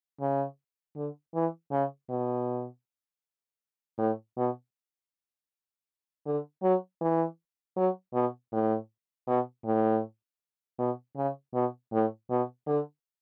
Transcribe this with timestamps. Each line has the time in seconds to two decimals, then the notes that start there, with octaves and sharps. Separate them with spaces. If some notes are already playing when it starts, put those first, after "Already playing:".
0.21 C#3
0.96 D3
1.35 E3
1.71 C#3
2.09 B2
3.98 A2
4.37 B2
6.26 D3
6.63 F#3
7.01 E3
7.77 F#3
8.14 B2
8.52 A2
9.27 B2
9.65 A2
10.78 B2
11.16 C#3
11.54 B2
11.92 A2
12.30 B2
12.67 D3